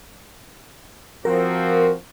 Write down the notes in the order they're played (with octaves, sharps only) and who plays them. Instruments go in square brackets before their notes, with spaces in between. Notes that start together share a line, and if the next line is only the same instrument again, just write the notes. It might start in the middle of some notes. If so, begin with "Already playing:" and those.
[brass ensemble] F3 C4 F#4 [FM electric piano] A#4